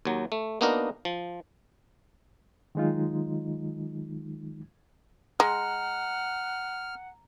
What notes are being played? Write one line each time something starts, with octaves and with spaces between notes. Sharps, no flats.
D#2 F#3
A3
A#3 B3 D4 D#4 F#4 A#4
F3
D#3 F#3 G#3 D#4 F4
G#3 F#5 A#5 F6